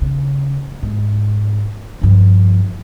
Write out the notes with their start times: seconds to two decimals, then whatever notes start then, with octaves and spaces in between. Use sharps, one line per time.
0.02 C#3
0.83 G#2
2.02 G2 F3